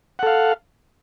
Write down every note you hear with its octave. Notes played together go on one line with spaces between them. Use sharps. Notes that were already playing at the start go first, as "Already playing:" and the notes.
A4 F5 F#5